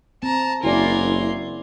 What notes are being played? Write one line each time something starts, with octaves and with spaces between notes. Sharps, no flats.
C4 A5 A#5
F#1 E4 F#4 A#4 D5 G#5 C6